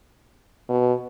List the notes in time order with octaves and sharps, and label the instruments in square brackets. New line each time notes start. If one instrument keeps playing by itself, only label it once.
[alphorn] B2